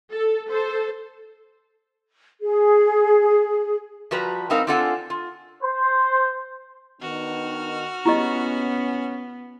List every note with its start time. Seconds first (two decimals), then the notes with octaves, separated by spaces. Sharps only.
0.12 A4
0.48 A4 C5
2.41 G#4
4.11 F3 G3 F#4 B4 A5 A#5
4.50 G3 B3 C4 D#4 A#4 F5
4.67 C4 D4 F4 A4 F#5 G#5
5.10 F4
5.63 C5
7.01 D#3 B3 D4 F#4 F6
8.06 B3 C#4 E4 G4 D#5